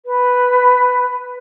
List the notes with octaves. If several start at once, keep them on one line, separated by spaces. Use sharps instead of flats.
B4